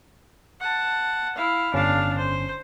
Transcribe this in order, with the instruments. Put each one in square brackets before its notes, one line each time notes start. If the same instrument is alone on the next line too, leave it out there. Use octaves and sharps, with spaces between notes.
[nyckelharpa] F#5 A5
E4 F5
[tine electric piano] G1 C#4 [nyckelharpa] D4 F5
[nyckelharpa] C5